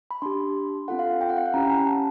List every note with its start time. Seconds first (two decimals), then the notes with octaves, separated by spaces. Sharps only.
0.11 B5
0.22 D4 G4 C6
0.88 C4 F4 A4 F#5
0.99 F5
1.10 F#5
1.21 G5
1.29 F#5
1.37 F5
1.46 F#5
1.54 C#4 E4 G4 A#5
1.70 G#5
1.87 A5